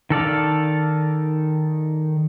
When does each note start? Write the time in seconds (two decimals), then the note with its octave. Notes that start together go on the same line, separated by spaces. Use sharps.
0.10 D#3 A4 D5 F5